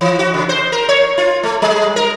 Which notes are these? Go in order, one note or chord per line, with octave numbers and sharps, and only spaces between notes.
E3
F#4
C#3
C5
A#4
C#5
F4
A3
G3
A#4